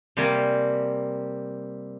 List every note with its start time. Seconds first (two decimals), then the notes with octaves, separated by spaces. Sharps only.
0.17 C3 G3 A#3 G#5